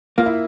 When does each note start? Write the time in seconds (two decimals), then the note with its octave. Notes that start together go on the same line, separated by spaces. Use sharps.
0.18 A#3 F4
0.26 E4